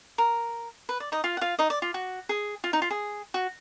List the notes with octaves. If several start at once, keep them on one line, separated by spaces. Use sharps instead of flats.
A#4
B4
D5
D#4 D#5
F4 F5
F#5
F4 F5
D#4 D#5
D5
F4
F#4
G#4
F4
D#4
F4
G#4
F#4